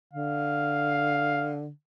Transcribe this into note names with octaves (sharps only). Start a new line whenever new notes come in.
D3 F5